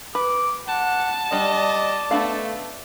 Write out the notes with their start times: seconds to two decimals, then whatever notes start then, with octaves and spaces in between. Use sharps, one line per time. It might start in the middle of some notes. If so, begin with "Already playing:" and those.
0.15 B4 D6
0.68 F#5 A5
1.32 G3 D4 D5 D#5
2.11 A3 B3 D4 F5